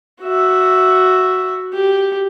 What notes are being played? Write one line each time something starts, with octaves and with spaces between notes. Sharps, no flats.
F#4 E5
G4